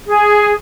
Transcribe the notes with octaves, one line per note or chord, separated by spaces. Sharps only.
G#4